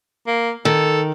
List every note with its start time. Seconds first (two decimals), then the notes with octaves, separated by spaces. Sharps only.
0.27 A#3
0.65 D#3 A4